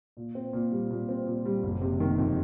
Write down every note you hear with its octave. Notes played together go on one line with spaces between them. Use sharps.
A#2
C4
A#2
G3
A#2
C4
A#2
G3
F#1
C3
D#3
F2